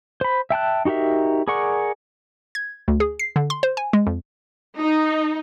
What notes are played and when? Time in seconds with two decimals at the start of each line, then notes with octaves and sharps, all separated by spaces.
0.21 C5 B5
0.50 E5 G5 A5 F#6
0.85 D#4 F#4 G4 A#4 E5
1.48 G#4 A#4 D5 F#5 C#6
2.55 G#6
2.88 D2
3.00 G#4
3.19 C7
3.36 D3
3.50 C6
3.63 C5
3.77 G#5
3.93 G#3
4.07 F2
4.79 D#4